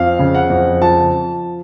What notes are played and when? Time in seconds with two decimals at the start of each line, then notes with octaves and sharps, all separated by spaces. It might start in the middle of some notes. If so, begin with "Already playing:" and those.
Already playing: F2 F5
0.19 C#3
0.34 F#5
0.50 F2
0.81 F3 A5